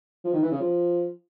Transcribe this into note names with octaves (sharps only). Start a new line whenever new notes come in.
F3
D#3
E3
C#3
F3